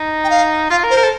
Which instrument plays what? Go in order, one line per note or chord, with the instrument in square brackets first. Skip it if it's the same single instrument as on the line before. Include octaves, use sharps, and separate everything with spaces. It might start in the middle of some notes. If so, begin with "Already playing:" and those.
Already playing: [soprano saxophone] D#4
[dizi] G5
F5
[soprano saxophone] F4 [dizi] F5
[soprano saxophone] A#4
[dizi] C5
[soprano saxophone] A#4
A4